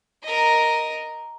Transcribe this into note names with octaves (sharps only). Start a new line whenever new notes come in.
A#4 D#5